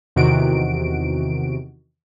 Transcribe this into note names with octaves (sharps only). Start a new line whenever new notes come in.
E2 C3 D#3 F#4 D7